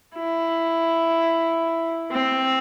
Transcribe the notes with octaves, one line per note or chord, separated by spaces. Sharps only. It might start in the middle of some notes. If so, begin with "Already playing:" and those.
E4
C4